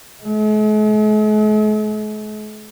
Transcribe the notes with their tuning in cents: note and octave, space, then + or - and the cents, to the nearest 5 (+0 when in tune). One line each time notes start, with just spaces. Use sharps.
G#3 +45